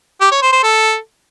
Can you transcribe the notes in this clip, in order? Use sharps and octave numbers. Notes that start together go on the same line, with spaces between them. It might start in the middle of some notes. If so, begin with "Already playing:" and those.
G4
C#5
C5
C5
A4